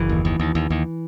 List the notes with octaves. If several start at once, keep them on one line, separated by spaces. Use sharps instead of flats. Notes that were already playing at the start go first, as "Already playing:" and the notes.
Already playing: F#1 E3
D#2
D#2
D#2
D#2
D#2